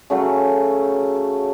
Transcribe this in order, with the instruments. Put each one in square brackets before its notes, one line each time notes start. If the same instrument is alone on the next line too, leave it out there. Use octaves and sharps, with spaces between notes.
[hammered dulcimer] C#3 F#3 A3